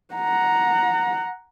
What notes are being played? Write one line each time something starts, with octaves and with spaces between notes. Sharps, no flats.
F#5 A#5